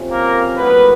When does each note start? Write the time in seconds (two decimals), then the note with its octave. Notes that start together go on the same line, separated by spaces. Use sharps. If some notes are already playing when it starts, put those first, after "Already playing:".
Already playing: F2 C3 F3 C#4
0.11 A#3 A#4
0.58 A2 F#3 A#3 B3 B4